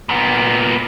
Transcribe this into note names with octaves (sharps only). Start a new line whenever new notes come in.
A#2 B3